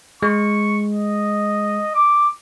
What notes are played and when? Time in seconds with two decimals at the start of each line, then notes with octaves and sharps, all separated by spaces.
0.23 G#3 C#6
0.92 D#5
1.95 D6